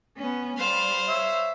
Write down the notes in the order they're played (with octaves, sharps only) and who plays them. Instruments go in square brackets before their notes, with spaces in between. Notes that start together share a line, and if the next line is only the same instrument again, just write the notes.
[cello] B3 C#4
[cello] G3 [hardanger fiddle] C5 F5
[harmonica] C#5 E5